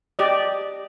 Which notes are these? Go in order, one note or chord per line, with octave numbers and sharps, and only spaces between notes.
G4 D5 D#5